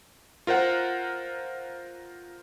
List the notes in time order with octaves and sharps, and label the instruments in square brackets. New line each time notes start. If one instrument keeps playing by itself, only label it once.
[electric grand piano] F4 A#4 C5 F#5